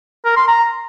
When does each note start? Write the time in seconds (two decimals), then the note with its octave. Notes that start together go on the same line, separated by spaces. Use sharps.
0.25 A#4
0.36 C6
0.48 A#5